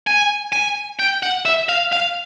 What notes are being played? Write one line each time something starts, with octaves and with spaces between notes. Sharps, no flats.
G#5
G#5
G5
F#5
E5
F5
F5